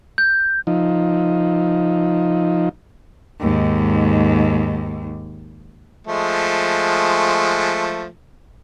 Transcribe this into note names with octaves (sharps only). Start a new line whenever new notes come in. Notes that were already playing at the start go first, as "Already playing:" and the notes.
G6
F3 D#4
D#2 G#2
F3 G#3 A3